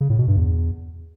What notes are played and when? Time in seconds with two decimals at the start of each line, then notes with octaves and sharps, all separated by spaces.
0.01 C#3
0.10 A2
0.19 B2
0.28 G2
0.37 E2